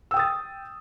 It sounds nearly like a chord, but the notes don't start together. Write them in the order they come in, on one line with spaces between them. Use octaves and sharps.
E6 G5 D#6 A6